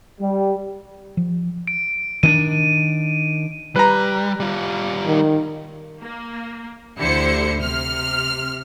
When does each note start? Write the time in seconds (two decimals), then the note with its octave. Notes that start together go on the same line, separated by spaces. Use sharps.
0.20 G3
1.17 F3
1.67 D7
2.23 D#3 C4 D4 D#7
3.76 G3 B4 A#5
4.40 G3 F4
5.05 D#3
6.02 A#3
6.99 D2 D3 E4 G4 C5 C#7
7.61 C3 F6